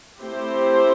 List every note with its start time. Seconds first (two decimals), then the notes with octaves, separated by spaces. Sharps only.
0.21 A3 C4 E4 G4 C5